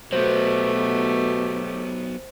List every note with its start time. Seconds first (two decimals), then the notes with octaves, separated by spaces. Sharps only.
0.12 B2 F#3 A3 B3 G4 C5